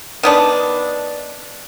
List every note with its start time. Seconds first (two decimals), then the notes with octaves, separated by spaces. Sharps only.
0.23 D#3 B3 D4